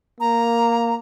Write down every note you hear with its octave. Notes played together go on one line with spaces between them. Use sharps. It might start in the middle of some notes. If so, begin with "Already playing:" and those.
A#3 A#5